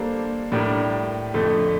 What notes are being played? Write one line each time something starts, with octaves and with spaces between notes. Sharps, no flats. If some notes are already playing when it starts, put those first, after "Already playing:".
Already playing: G3 A#3 D4 A4 C5
A2 G3 D4 G4 A#4
F2 D3 A3